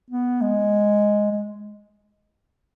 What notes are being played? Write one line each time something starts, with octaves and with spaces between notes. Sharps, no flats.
B3
G#3
G#3